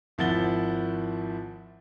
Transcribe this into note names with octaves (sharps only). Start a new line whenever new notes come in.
G#1 F3 E4 F#5 A6 G7